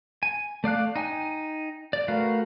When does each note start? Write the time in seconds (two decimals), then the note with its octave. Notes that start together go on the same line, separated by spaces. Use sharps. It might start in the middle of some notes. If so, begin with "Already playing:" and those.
0.23 G#5
0.64 A3 D5 F5 F#6
0.96 D#4 G5 G#5
1.93 D5
2.08 A3 F#4 A#4 B4 F5